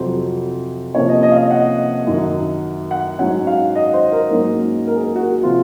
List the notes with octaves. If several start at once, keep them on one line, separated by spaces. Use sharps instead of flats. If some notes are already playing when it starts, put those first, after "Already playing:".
Already playing: F2 C3 F#3 C5
C3 F3 A#3 C#4 C#5
D#5
D#5
F5
D#5
F#5
F#2 D#3 F#3
F#5
G#2 F#3 C#4 F#5
F5
D#5
C5
A#4
G#2 F#3 A#3 C#4
A#4
G#4
A#4
F#4
C3 F3 C4 F4